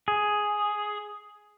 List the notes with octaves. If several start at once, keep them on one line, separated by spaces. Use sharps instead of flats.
G#4